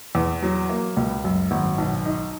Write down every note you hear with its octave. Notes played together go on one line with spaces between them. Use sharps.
E2
F#3
A#3
C#2
F#2
G#1
B1
D#4